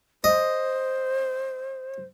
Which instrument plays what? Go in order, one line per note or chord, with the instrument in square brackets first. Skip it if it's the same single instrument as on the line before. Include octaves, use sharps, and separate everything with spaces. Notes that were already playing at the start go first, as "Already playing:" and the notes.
[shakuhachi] C5 [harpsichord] D#5